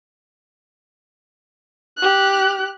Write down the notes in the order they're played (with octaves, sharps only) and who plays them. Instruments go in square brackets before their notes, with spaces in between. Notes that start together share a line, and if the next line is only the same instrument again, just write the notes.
[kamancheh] G4 F#6